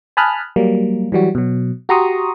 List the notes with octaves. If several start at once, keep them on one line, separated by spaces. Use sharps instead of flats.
G#5 A5 B5 D#6 F6 F#6
F#3 G3 A#3
E3 F#3 G3 F#4
B2 F#3
F#4 G4 A#5 C6 C#6 D#6